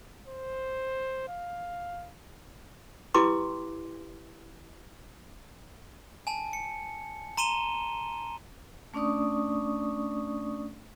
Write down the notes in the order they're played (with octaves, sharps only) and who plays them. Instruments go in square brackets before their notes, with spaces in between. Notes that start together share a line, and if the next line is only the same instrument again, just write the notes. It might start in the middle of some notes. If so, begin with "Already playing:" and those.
[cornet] C5
F5
[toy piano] E4 G4 B4 G5 C6 D6
[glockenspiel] G#5 A5
C#7
A#5 C6 D#7 E7 G7
[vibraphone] A3 C#4 D4 D5 C#6 D#6